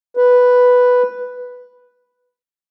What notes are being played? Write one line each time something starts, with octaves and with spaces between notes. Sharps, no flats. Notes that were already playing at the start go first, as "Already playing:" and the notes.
B4